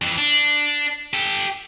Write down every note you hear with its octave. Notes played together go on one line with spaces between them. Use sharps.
F2 E3
D4
G4 A4